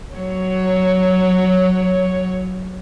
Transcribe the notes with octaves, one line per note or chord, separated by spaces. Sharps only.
F#3 C#5